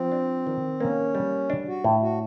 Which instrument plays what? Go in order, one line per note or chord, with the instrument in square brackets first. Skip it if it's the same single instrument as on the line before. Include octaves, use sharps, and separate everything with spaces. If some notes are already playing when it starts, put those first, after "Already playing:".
Already playing: [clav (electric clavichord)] F3 [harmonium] C4
[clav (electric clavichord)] D4
D#3
[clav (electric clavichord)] A#3 [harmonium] C#4
[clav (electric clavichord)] G3
D4
[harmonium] F#4
[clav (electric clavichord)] A2
[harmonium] F#4